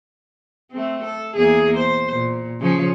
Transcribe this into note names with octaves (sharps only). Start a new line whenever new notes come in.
A3 C4
A4
E2 A#3 G#4
C5
A#2
C#3 F3 C#4